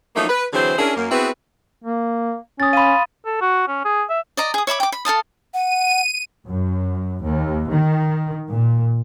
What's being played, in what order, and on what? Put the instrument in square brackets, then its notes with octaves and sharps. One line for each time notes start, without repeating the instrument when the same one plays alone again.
[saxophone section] F3 F#3 A3 A#3 D#4
B4
D3 E3 F#3 C4 G#4 C5
C#4 D4 E4 G#4 A#4
F#2 A#3
B3 C4 E4 F#4 G#4 B4
[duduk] A#3
[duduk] C#4 [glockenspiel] D#6 A6
[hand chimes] F5 B5 [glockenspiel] C6 D#7
[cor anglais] A4
F#4
C#4
G#4
E5
[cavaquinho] D5 D#5 A#5
G#4 D#6
C#5 E5 B5 D6
G5 D6
B5
A4 F5 A5 D#6
[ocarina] F#5 [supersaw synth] D#7
[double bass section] F#2
D#2
D#3
A#2